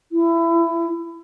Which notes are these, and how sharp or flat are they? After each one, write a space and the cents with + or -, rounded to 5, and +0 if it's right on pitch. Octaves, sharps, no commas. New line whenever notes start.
E4 +20